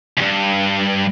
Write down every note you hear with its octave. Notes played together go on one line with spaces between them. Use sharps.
D2 G2